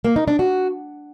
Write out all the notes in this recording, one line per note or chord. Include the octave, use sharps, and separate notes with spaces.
A#3
D#4
D4
F#4